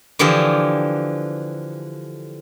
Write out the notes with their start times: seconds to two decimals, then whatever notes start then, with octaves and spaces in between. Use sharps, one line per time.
0.19 D3 E3 F3 G4 G#4